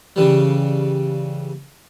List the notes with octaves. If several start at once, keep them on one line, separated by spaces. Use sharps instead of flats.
C#3 E3 G3